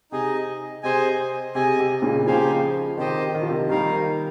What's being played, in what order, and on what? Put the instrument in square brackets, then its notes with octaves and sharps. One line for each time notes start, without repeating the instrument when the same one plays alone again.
[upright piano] C3 [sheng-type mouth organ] D#4 G#4 D#5
[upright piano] C3 [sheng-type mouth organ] G#4 C5 D#5 G#5
[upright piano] C3 [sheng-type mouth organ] G#4 D#5 G#5
[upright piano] C3
A#2 C#3
[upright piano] C#3 F3 [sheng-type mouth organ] D#4 G4 C5 F5 G#5
[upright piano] C3 D#3 [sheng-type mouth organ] G4 C5 D#5
[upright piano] D#3
F3
C3 D#3
[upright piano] D#3 G3 [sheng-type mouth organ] A#3 D#4 A#4 F5